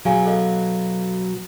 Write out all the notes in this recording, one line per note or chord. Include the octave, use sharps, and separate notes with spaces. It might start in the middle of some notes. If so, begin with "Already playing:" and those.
B2 F#3 G#4 F5 G#5
A4 D#5 F5